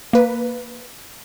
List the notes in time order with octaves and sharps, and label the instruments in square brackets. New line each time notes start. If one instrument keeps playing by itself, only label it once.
[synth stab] A#3 B4